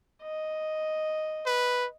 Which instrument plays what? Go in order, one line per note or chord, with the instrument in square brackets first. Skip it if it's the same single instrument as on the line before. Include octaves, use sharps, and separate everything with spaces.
[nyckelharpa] D#5
[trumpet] B4